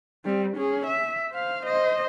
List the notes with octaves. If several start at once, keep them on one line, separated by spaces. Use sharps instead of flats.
G3 C4
C#4 G#4
E5
C5 F5
C5 D#5